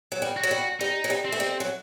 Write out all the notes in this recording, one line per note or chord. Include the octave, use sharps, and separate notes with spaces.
F#3
G3
F#4
F#3
G3
G3 D#4
F#3
G3
C4
A3
G3
F#3